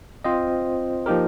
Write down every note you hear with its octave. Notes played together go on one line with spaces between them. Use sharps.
C4 F4 C5 D#5
F3 A#3 D#4 G4 A#4